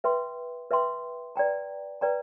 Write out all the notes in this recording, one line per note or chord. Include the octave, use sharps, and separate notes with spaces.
B4 E5 G5 C6
B4 E5 G5 C6
B4 D5 G5 A#5
B4 D5 G5 A#5